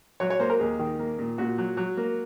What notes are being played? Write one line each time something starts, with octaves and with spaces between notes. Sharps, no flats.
F#3 C#5
C#5
A#3 C5
A#4
D#2 G#4
D#3
A#3
A#2
A#2 F#4
F#3
F#3
A#3